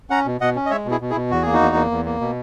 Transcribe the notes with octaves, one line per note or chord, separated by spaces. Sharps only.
C#4 F#5 A#5
B2
B2 D#5 F#5
C#4
D#5
G#3 C#5 E5
B2
E4 G#4
B2
E4 G#4
B2
E2 F#4
A#3 G#4
D#4 F#4
E2
A#3
E2
A#3
B2